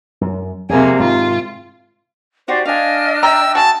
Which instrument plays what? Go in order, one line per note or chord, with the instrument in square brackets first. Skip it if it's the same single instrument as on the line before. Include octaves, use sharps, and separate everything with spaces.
[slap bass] F#2
[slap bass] F2 F#3 [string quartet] C3 A#3 G#4
[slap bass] G#2 C3 D#3 [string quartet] F4
[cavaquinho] D#4 F#4 G4 [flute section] C5 D5
[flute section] D4 D#5 F6 [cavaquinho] F5 G#5
[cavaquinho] E5 G5 [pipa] A#5 [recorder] E6
[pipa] F#4 G#4 [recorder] A5